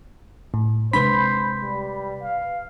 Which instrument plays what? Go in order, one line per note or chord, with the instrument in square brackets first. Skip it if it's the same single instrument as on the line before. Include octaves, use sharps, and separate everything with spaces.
[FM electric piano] A2
[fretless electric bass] C3 G#3 D4 [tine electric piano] B4 B6 [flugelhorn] C5 [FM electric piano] B5
[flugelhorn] G3
F5